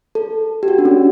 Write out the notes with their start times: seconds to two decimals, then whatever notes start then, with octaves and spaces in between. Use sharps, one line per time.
0.15 A4
0.63 G4
0.68 F#4
0.78 D4
0.85 C#4